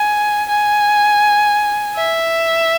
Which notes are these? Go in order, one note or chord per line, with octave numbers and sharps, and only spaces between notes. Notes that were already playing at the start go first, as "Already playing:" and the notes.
Already playing: G#5
G#5
E5